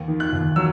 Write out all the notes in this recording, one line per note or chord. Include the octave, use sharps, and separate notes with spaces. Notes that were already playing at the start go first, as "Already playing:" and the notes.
Already playing: D#2
D#3
F#6
D#2
F#3 E6